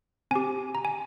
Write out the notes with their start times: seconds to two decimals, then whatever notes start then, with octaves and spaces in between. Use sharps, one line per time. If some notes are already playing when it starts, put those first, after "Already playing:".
0.31 C4 G4 G#5
0.75 A#5
0.85 G#5